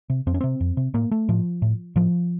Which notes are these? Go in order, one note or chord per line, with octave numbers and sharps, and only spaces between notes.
C3
F2 C4
C#4
C3 C4
F2
C3
A2 A#3
A3
A2 F3
A2
A2 F3